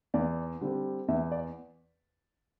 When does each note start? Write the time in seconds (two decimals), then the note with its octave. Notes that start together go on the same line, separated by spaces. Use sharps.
0.14 E2 D5
0.61 D3 G3 C4
1.08 E2 E5
1.32 D5